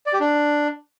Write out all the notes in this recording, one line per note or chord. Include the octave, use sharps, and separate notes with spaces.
D5
G4
D4